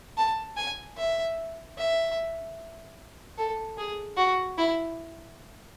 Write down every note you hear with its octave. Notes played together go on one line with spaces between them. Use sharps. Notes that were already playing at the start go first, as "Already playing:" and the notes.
A5
G#5
E5
E5
A4
G#4
F#4
E4